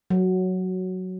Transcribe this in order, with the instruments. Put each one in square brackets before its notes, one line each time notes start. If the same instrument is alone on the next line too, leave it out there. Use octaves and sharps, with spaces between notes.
[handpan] F#3